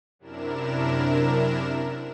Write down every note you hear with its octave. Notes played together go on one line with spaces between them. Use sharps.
F#2 C3 D4 E4 A#4 E7